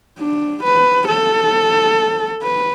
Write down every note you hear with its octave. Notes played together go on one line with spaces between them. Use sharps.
D4
B4
A4
B4